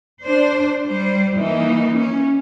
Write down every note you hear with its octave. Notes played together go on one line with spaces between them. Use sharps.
D4 C5
G3 C5
E3 A#3 D#4
C#4